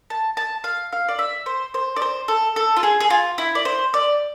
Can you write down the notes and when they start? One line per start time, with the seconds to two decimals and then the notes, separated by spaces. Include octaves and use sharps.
0.10 A5
0.37 A5
0.64 F5
0.93 F5
1.08 D5
1.19 E5
1.46 C5
1.74 C5
1.96 D5
2.02 C5
2.28 A4
2.56 A4
2.77 F4
2.83 G#4
3.00 G#4
3.10 F4
3.38 E4
3.55 D5
3.65 C5
3.94 D5